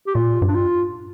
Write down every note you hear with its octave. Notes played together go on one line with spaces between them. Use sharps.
G4
A#2 F4
G2
D4
F4